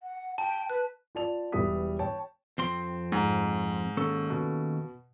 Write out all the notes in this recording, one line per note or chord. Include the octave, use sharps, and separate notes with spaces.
F#5
G5 A5
B4 F#6
F4 D5 A5 F7
E1 E3 G3 E5 D#6 B6
C#5 G5 A5
F2 C4 C6
G#2
D#2 C#4 A4
B2